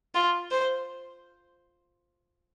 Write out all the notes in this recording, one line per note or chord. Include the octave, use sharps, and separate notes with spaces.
F4
C5